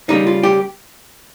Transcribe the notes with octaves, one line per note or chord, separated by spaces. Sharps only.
C#3 G3 A#3 D#4
F4
G4